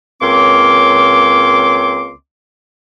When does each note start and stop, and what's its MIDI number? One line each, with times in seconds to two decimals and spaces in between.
0.21 2.12 37
0.21 2.12 58
0.21 2.12 60
0.21 2.12 73
0.21 2.12 84
0.21 2.12 86